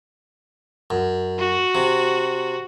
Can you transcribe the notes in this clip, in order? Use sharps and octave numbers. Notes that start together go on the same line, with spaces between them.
F#2
F#4
C3